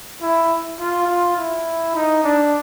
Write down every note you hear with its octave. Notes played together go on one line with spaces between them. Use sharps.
E4
F4
F4
E4
D#4
D4